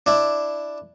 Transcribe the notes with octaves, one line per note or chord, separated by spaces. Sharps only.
D4 E4